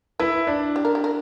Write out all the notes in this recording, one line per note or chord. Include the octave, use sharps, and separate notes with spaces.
E4 B4
D4
G4
A#4
G4
A#4